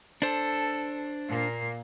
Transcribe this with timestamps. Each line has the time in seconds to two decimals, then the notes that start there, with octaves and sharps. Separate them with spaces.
0.22 D4 A4 C5
1.28 A#2 A#3